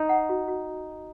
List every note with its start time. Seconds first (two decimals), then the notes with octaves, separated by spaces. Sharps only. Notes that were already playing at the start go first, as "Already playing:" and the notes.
Already playing: D#4
0.09 F#5
0.29 F#4
0.48 F#4